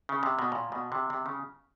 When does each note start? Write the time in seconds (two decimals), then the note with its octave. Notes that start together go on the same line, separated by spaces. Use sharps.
0.09 C#3
0.23 C3
0.39 B2
0.52 A#2
0.72 B2
0.92 C3
1.10 C3
1.26 C#3